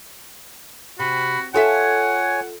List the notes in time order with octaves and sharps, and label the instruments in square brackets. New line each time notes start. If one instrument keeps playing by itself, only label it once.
[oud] C3 [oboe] F#4 [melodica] B5
[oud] F4 A4 E5 [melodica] C#5 G#5 [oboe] F#5